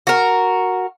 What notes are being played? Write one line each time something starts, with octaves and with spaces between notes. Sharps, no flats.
F#4 A#4